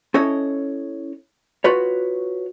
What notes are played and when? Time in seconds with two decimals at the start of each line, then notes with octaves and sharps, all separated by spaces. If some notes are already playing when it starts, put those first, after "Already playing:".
0.14 C#4 E4 A4 C#5 D#5
1.64 F4 F#4 B4 C#5